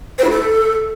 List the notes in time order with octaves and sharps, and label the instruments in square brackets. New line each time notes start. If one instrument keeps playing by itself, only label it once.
[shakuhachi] C5
E4
A4